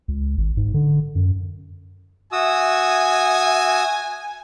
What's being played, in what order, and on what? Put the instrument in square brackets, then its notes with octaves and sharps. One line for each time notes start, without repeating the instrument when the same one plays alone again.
[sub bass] C#2
G#1
G#2
D3
F#2
[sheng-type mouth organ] F#4 D#6 E6 [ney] E5 [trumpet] G#5